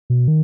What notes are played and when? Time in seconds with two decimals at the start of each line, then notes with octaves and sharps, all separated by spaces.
0.10 B2
0.28 D#3